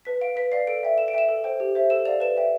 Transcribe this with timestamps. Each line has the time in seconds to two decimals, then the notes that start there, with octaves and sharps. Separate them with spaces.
0.05 B4 B6
0.21 F5 D7
0.36 B4 B6
0.52 D5 F5 C7
0.67 A4 D7
0.83 E5 G5
0.97 A4 E7
1.08 D7
1.13 E5 G5 E7
1.28 A4
1.44 C5 G5
1.60 G4
1.75 C5 E5
1.90 A4 E7
2.05 D5 F5 F7
2.20 B4 E7
2.36 E5 G5